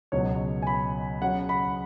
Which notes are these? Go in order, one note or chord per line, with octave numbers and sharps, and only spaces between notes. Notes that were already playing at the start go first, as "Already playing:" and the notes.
C#2 B2 F#3 B3 C#5
G#5
B5
C#3 F#3 C#4 F#5
B5